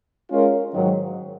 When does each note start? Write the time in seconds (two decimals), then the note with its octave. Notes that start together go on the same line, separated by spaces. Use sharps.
0.30 G#3 C#4 F4 A#4 C#5
0.74 G#2 D#3 F#3